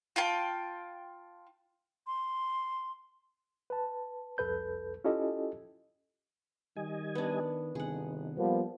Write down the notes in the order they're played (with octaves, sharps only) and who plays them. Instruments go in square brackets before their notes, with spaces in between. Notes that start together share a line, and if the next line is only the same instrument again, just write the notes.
[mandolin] F4 G5 A5
[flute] C6
[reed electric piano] B4 A5
C2 F2 A4 B4 G6
C#4 E4 F4 G4 A4 D#5
[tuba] D#3 [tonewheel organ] G3 D#5 G#5
[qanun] B3 D4
[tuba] G1 [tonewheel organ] C3 D#3 [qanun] G#4 F#5
[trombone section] F3 A#3 B3 [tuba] G3